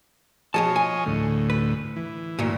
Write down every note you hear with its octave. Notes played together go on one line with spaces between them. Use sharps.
B2 F3 G#4 C#5 D#5 A5
G#5
D2 A2
B4
E3
D2 G2 A#2